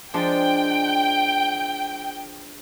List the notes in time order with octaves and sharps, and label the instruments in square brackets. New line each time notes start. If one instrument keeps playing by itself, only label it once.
[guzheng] F3 G#3 D4 [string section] G5